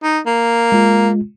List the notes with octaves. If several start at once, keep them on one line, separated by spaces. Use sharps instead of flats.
D#4
A#3
G#3 F4